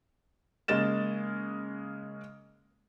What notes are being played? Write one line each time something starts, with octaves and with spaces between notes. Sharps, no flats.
C#3 G#3 A#3 D#5 A6 E7